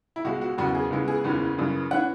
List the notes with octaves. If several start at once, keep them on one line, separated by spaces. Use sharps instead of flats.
E4
C#2 B2 G#3 F#4
F#4
E1 E2 C#3 F#3 B3 F#4
G#4
C#2 C#3 E3 G#3 B3
G#4
F#1 E2 C#3 E3
F#2 C#3 E3
E3 C#4 F#5